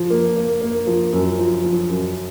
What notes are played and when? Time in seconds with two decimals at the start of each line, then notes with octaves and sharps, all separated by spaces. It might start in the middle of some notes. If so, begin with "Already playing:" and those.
Already playing: F3
0.10 A#3
0.36 A#3
0.61 A#3
0.87 F3
1.13 F#2
1.38 F3
1.64 F3
1.89 F#2